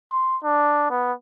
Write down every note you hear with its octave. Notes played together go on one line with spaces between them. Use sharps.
C6
D4
B3